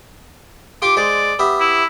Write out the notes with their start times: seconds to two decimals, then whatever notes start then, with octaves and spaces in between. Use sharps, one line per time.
0.82 F4 G4 C6 D6
0.97 G#3 C5 D5
1.39 B3 G4 E5
1.60 E4